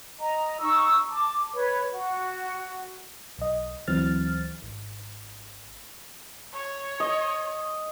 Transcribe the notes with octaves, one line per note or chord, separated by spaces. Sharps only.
D#5 A#5
D#4 C#6 E6
A5 D6
B4 C#5
F#4
B1 D#5
D2 E3 F#3 C4 F6 A6
G#1
C#5
D#5